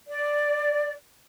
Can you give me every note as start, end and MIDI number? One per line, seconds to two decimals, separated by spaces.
0.08 0.93 74